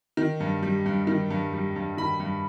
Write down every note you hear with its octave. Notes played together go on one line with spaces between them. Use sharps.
D#3
G2
G3
G2
D#3
G2
G3
G2
D#3 B5
G2